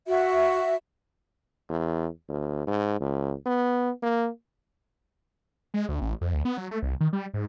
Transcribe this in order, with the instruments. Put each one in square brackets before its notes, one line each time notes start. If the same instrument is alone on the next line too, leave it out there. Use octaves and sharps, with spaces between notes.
[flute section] F#4 E5
[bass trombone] E2
D2
G#2
C#2
B3
A#3
[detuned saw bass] G#3
D2
A1
F2
D2
B3
F#3
A3
C2
D#3
G3
G#2